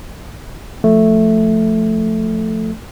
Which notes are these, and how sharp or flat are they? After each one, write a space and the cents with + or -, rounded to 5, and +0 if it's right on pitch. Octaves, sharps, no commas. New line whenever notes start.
F3 +0 A3 +0